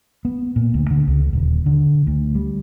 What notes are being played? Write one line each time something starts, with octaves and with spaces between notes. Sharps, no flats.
B3
A#2
D2
D3
C#2
D#1
D3
D2
G3